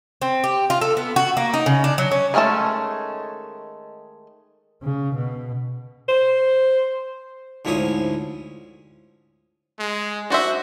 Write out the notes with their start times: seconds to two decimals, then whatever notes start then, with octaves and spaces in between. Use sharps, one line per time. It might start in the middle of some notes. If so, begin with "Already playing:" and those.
0.22 C4
0.44 G4
0.70 F4
0.81 A4
0.97 B3
1.16 F#4
1.37 A#3
1.54 D#4
1.66 C#3
1.84 D4
1.98 F#3
2.11 C#4
2.34 D#3 G#3 A3 C#4 A5
4.82 C#3
5.16 B2
6.08 C5
7.65 D2 G#2 F3 E4 C#5 D#6
9.79 G#3
10.30 D4 F#4 C5 E5